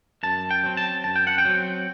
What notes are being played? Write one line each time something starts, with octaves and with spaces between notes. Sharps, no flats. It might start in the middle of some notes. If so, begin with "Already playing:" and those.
F#2 A5
G5
F#3 C4
A5
F#2 A5
G5
F#5
G5
F#3 C4